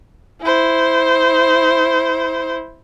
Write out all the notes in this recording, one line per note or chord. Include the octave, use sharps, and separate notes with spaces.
E4 C5